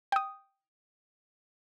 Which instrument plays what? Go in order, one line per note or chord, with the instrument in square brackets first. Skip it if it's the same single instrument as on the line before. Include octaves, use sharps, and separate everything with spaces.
[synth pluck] G5 D#6